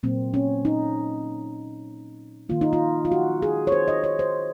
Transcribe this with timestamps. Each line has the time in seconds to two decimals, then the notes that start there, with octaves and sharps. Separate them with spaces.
0.03 A#2 F#3 A#3 C4
0.34 C#4
0.65 D#4
2.49 D#3 A#3 F4
2.61 D#4
2.73 F4
3.05 F4
3.12 F#4
3.42 G#4
3.67 C#5
3.72 C5
3.88 D#5
4.04 C#5
4.19 C5